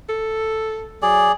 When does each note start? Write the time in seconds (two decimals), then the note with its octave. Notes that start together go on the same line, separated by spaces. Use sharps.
0.09 A4
1.02 F#3 G#4 D5